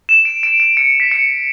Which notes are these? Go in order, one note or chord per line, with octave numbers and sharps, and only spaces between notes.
E7
D7
D7
D7
C#7
B6
C#7